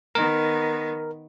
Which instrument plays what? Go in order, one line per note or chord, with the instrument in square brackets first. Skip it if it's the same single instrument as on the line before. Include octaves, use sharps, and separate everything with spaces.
[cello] D#3 B3 [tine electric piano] A#4